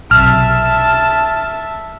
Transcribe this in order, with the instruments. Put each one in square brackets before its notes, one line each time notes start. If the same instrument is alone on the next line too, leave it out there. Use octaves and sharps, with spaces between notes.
[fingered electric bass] B1 C3 [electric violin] E5 A5 [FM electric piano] F6